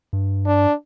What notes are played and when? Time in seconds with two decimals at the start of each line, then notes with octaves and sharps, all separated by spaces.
0.13 G2
0.46 D4